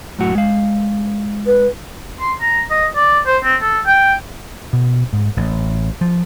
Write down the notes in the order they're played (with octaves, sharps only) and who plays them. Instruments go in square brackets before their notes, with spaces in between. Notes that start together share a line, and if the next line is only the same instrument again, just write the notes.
[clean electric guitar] F#2 A2 F#4
G#3 F5
[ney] B4
[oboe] C6
A#5
D#5
D5
C5
C4
A4
G5
[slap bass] B2
G#2
A1
F3